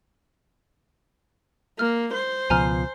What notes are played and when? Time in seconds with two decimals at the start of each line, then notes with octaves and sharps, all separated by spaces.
1.79 A#3 F6
2.14 C5
2.50 C#2 B2 F3 G#5 A#5 F6